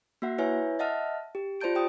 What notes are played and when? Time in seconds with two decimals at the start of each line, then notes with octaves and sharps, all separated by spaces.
0.22 A#3 F#4 E5 F#5
0.38 E4 B4 C#5 E5 G#5
0.79 D#5 E5 F#5 A5 F6
1.35 G4
1.61 F4 C5 D5 A5 G6 D7
1.75 G4 G5 D#6